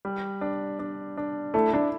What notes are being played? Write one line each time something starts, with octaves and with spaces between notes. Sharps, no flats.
G3
D4
D4
D4
A3 E4
D4